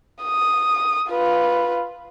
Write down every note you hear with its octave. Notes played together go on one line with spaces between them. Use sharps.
D#6
F4 B4